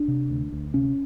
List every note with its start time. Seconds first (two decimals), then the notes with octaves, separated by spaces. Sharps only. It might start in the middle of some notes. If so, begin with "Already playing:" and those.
Already playing: D4
0.08 C3
0.30 D2
0.52 D2
0.74 C3 C#4